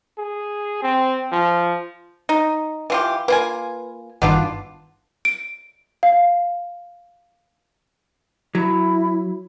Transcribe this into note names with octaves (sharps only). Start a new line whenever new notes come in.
G#4
C4
F3
D#4
E3 F4 G4
A#3 F4 B4 G#5
G1 G2 D#3 B3 D4 F4
D7
F5
F#3 E4